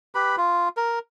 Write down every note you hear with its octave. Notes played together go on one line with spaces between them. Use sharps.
G4 B4 B5
F4
A#4